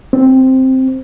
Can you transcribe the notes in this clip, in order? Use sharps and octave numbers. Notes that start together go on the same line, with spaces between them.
C4